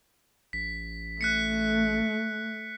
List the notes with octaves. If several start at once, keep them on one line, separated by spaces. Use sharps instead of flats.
A1 B6
A3 F#6 B6 C#7